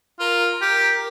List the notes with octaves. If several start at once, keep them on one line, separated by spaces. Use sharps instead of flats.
F4 A#4
A#4
G4